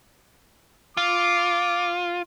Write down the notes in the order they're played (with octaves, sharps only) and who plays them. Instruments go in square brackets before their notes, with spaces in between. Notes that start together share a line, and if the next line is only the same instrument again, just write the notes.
[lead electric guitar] F4 [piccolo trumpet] D6